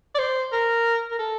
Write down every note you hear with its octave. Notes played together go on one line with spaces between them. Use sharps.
D5
C5
A#4
A#4
A4